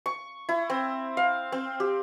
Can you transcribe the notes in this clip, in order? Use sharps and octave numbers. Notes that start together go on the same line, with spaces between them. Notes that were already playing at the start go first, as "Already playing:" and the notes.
C#6
E4
C4
F5
C4
G4